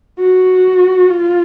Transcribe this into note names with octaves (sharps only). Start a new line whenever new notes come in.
F#4
F4